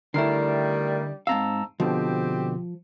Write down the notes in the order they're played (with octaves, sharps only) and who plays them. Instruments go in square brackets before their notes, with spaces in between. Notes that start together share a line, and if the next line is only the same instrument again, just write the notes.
[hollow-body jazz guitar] D3 E4 [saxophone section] D#3 G3 [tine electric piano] A3 A#4 C7
[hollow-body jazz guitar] G#2 C4 F5 [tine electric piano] A5 A#5 E6
[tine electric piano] B2 D3 [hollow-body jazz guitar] F3 [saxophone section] C4 G4